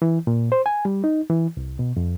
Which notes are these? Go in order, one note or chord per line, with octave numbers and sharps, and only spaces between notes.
E3
A#2
C5
G#5
G3
D#4
E3
C2
B2
F2